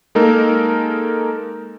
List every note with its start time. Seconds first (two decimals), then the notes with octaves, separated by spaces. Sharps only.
0.15 G#3 A#3 D#4 A4 A#4